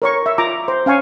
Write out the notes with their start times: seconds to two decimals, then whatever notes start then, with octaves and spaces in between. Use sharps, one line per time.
0.02 A#4 C#5 C#6
0.26 E5
0.38 F4 A#5 D6
0.68 C5
0.86 C#4 F5 G#5 C#6